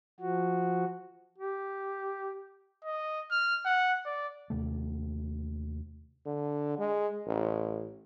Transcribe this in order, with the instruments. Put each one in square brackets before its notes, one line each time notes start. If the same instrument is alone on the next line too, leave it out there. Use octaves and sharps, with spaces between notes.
[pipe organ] F3 F#4
[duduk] G4
[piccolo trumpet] D#5
F6
F#5
D5
[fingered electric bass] D#2 C3 A3
[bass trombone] D3
G#3
A1